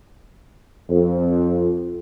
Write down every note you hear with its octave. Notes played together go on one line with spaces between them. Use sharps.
F2